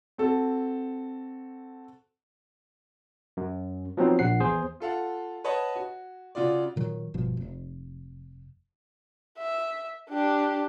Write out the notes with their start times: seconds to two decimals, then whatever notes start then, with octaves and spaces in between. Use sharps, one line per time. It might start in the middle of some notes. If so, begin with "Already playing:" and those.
0.18 C4 F#4 A4
3.37 F#2
3.97 F3 F#3 B3 C4 D#4
4.19 A#1 F#5 C7
4.40 E2 G#4 C5
4.80 F4 A4 F5 F#5
5.44 B4 C#5 D#5 F#5 A5
5.75 F#4
6.35 C#3 F4 F#4 D5
6.76 A#2 D#3 F#3
7.14 G1 B2 F3
7.37 F1
9.38 E5
10.09 D4 G4